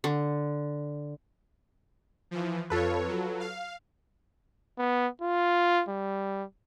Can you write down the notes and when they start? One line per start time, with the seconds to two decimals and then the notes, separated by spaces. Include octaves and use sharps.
0.04 D3
2.31 E3 F3
2.70 F2 F4 A4 B4 C#5
3.08 F#3
3.40 F5
4.78 B3
5.22 F4
5.89 G3